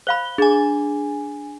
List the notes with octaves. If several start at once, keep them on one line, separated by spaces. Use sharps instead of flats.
C5 F5 B5 G7
D4 G#4 G#5